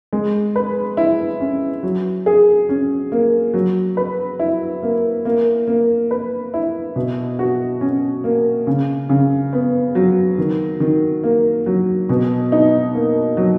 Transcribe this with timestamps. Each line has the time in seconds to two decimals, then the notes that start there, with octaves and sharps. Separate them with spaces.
0.13 G#3
0.56 B4
0.97 E4
1.40 C#4
1.83 F#3
2.26 G#4
2.69 C#4
3.12 A#3
3.54 F#3
3.97 B4
4.39 E4
4.83 A#3
5.25 A#3
5.67 A#3
6.11 B4
6.54 E4
6.96 B2
7.39 F#4
7.81 C#4
8.24 A#3
8.67 C#3
9.09 C#3
9.53 B3
9.95 F#3
10.38 D#3
10.80 D#3
11.24 A#3
11.66 F#3
12.09 B2
12.52 D#4
12.94 A#3
13.37 F#3